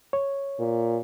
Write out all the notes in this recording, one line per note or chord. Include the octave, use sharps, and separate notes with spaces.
C#5
A#2